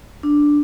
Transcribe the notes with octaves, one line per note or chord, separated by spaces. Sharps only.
D4